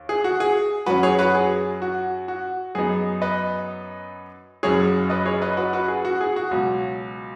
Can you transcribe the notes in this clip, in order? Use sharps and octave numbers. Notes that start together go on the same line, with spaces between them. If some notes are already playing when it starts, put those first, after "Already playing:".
Already playing: D#2
G#4
F#4
G#4
F#2 F#3 C#4 F#4 B4
G#4 C#5
F#4 B4
G#4
F#4
F#4
F#2 F#3 B3 D#4 G#4
B4 D#5
F#1 F#2 F#3 C#4 G#4 C#5
B4 D#5
G#4 C#5
B4 D#5
F#4 B4
F#4 B4
G#4
F#4
G#4
F#4
C#2 B2 F#3